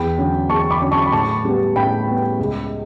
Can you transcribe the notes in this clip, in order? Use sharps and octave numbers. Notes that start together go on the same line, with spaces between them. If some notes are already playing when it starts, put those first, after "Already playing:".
Already playing: E2 G5 B5
D3 F#3 C#4
E2 A5 C#6
B5 D6
D3 F#3 C#4
A5 C#6
B5
A2 A5 C#6
G3 B3
A2 G5 B5
G3 B3
C#2